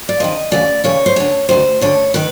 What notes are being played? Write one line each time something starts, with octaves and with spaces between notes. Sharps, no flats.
D5
F2 C3 D#3 D#5
D2 C#3 E3 D5
D#2 C#3 E3 C#5
C5
D2 D3 C#5
D2 C3 D#3 C5
D2 D3 C#5
D#3 B4